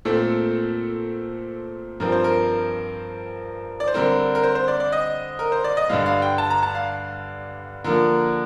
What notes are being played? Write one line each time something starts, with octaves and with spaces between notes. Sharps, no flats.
A#2 A3 C4 A4
G2 F3 C4 A#4
C5
A#4
D5
C5
D3 G3 C4 A#4
A#4
C5
C5
D5
D5
D#5
A#4
C5
D5
D#5
G2 D3 G3 F5
F5
G5
A5
A#5
A5
F5
D3 F3 A#3 A#4